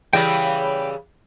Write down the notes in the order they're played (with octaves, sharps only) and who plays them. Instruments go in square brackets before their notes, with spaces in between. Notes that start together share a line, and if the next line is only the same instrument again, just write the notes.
[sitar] C#3 E3 G3 [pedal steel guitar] G5 B5